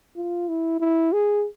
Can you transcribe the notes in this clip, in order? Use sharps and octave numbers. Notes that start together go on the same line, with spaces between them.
F4
E4
E4
G#4